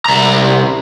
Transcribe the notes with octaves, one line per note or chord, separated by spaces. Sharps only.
C2 A#5